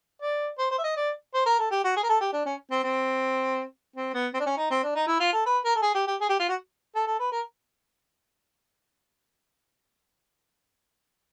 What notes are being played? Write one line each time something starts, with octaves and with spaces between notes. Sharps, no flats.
D5
C5
C5
E5
D#5
D5
C5
A#4
A4
G4
F#4
G#4
A#4
A4
G4
D4
C#4
C4
C4
C4
B3
C4
D4
C#4
D#4
C4
D4
D#4
E4
F4
A4
B4
A#4
A4
G#4
G4
G4
G#4
G4
F4
F#4
A4
A4
B4
A#4